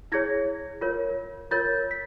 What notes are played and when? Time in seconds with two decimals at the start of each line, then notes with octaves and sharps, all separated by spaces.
0.12 E4 G#4 C#5 G#6 A#6
0.81 F4 A#4 C#5
1.51 F4 A#4 C#5 G6 A6
1.91 B6